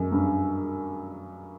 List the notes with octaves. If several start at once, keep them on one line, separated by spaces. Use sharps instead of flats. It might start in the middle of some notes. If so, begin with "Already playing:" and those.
Already playing: F#2
G2